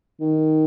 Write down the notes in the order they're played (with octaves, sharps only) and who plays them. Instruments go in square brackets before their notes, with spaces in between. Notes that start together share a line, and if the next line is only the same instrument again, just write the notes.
[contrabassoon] D#3